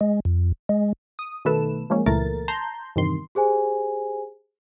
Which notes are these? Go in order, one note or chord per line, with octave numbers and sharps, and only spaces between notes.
G#3
F2
G#3
D#6
B2 D#3 A3 A4 B4 E7
F3 G#3 A#3 C#4
C#2 A#2 E3 A3 A#4 A6
A5 A#5 C6 G6
E2 G2 C3 D#3 C6
G4 G#4 C5 G#5